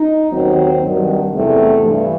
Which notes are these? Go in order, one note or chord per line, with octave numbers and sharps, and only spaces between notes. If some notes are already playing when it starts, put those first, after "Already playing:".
Already playing: D#4
D#2 D#3 F#3 C4
G2 D#3 F#3
E2 C3 E3 A3
G2 E3